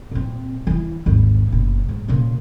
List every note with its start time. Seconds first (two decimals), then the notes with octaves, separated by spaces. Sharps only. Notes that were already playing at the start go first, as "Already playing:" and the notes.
0.11 A#2 C4
0.67 E3 E4
1.06 G#1 D#2
1.52 F#1 B2
1.89 G#2
2.08 A#2 C#3